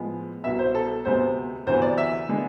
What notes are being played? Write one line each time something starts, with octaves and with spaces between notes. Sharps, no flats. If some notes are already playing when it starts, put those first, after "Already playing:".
Already playing: A2 F3 G#3 B3
C2 B2 B3 E5
C5
A4
D2 C3 G#3 B3 C5
D2 C3 E3 B3 C5
D5
E5
D3 G#3 B3